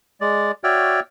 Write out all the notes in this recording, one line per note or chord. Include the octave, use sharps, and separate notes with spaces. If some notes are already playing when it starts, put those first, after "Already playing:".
G#3 D5
F#4 C#5 D5 E5 G5 F6